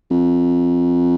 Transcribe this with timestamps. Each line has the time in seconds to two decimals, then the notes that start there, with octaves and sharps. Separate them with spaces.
0.10 F2